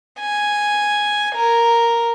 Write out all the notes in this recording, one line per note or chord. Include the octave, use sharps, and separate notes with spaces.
G#5
A#4